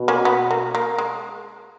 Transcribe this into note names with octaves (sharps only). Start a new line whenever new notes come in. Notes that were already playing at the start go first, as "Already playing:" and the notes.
Already playing: B2
A#3 C#4
B3
A#3
A#3
G#3